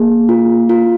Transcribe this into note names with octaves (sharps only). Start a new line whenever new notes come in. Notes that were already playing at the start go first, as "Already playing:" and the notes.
Already playing: A#3 G#4
F4
F4